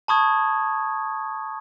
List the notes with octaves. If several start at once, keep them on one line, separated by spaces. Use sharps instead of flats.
A5 B5 C#6 D#6 G#6